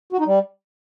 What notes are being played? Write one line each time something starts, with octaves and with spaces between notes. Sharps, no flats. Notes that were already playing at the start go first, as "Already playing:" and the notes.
F#4
D#4
G3